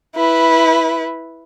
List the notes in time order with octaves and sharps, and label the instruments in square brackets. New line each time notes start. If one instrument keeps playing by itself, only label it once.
[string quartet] E4 B4